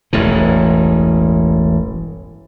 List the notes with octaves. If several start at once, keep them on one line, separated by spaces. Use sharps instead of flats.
E1 A1 G2 E3